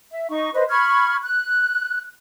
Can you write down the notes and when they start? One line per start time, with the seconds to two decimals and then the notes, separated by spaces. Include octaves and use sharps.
0.10 E5
0.30 D#4 C#6
0.54 B4 C5 D#5
0.69 B5 C#6 F6 G#6
1.22 F#6